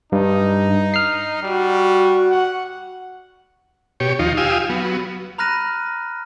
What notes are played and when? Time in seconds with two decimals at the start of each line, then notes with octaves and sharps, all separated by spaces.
0.12 G2 D#4
0.94 F6 C7
1.42 G3 F#4
2.31 F#5
4.00 B2 G4 C#5
4.19 D#2 F3 D#4 F4
4.37 F4 G4 F5 G#5 D#6 E6
4.69 F#3 B3
5.38 A#5 B5 F6 F#6 A#6 D#7